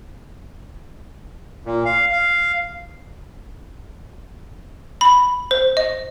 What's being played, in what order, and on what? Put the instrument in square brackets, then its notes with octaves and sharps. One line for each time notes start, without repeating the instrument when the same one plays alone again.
[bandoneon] A#2
F5
F5
[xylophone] B5
C5
D#5